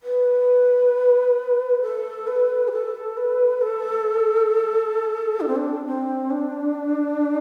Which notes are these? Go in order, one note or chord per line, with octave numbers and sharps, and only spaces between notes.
B4
A4
B4
G4
A4
B4
A4
D4
C4
D4
C4
D4